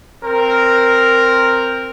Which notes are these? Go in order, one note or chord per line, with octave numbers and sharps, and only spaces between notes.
C4 A#4